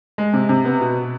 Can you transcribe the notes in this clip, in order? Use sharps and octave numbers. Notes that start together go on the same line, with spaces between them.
G#3
C3
C3
B3
B2